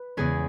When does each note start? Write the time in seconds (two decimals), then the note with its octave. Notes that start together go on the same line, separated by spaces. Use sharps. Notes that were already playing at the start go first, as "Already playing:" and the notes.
Already playing: B4
0.17 E2 C#3 G#3 B3 G#4